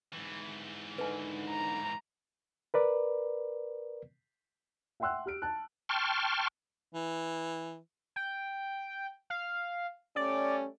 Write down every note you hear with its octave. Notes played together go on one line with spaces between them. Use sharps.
G#2 E3
D3 D#3 D#4 B4 G#5
A#5
A#4 B4 D5
E5 F#5 G5 C6 E6 F#6
G4 F6 D7
A5 F#6
G5 A5 C6 C#6 F6
E3
G5
F5
G3 A3 C#4 D5